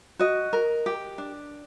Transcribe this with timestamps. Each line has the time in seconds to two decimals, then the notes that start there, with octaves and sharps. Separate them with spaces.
0.19 F#4 D#5
0.53 A#4
0.86 G4
1.18 D4